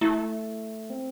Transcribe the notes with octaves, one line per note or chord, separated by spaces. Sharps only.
A3 E4
C4